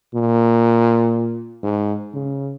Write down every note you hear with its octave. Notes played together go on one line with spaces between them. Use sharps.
A#2
G#2
C#3